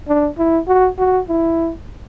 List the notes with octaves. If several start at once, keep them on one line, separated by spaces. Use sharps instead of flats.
D4
E4
F#4
F#4
E4